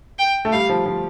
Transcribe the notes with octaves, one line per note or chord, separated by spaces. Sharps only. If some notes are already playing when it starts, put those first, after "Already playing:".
G5
A3
G3 F5
F3
F3